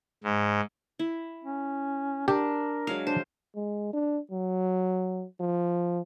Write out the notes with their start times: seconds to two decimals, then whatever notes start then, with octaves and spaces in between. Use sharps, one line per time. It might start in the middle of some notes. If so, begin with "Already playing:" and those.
0.24 G#2
0.99 E4
1.44 C#4
2.28 D4 G4 A#4
2.87 F#3 G#3 F5
3.07 D4 C5
3.56 G#3
3.93 D4
4.31 F#3
5.40 F3